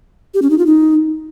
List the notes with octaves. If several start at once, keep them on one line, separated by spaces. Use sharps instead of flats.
G4
C#4
D#4
F4
D#4